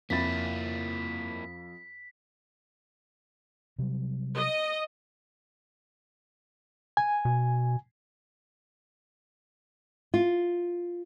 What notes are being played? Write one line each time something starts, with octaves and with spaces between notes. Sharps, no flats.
F2 A#3 E4 B5 A6 B6
C3 F#3 G3
D#5
G#5
B2
F4